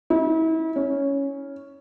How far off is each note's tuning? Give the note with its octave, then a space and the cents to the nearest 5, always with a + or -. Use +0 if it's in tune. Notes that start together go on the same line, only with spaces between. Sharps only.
E4 -35
C#4 +5